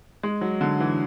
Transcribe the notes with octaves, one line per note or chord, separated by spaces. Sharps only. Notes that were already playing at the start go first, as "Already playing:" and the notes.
G#3
F#3
D3
E3